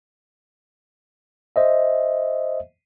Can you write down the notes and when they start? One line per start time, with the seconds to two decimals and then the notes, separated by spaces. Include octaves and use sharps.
1.56 C5 D#5 E5